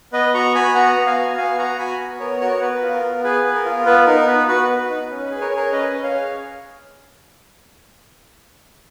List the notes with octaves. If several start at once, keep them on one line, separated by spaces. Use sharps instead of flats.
B3 B4 D#5
F#4 A#5 C#6
F#4 G#5 B5
B3 F#5 A#5
B3
F5 G#5
F#4
B3 F5 G#5
F#4 F#5 A#5
F#4 G#5 B5
B3
B3 A#4 C#5
F#4 A#4 C#5
B3 B4
F4
A#4
B3
G#4 B4
B3
A#4
F4
B3 B4
D#4 A#4
B3 B4
F#4 B4
B3
D#4
C#4
G#4 B4
A#4 C#5
G#4 A#4 C#5
C#4 B4 D#5
C#4
C#5 F5
G#4